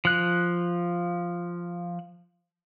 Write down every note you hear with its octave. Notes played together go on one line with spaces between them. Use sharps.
F3 F#6